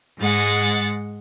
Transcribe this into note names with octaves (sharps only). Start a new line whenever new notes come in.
G#2 G#3 F#5 A6